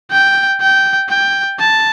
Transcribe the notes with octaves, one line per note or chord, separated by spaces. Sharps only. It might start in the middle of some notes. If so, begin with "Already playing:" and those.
G5
G5
G5
A5